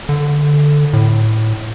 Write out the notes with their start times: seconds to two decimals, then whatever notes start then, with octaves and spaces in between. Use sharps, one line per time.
0.09 D3
0.93 A2